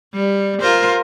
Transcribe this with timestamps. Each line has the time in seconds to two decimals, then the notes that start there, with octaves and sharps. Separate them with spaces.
0.14 G3
0.60 F4 A#4 C5